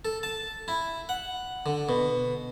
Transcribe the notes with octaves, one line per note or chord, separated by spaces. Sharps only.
A4
A5
E4
F#5
D3
B2